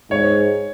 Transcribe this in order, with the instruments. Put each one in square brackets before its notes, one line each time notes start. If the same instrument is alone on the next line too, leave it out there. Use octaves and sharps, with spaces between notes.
[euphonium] G#2 [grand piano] C#5